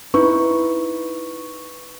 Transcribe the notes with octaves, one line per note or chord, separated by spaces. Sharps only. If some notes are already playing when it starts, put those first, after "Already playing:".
D#4 E4 B4 C#6